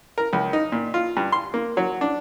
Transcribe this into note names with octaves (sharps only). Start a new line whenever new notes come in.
A#4
C#2
D#4
A#2
F4
G2
C6
A#3
F#3
D4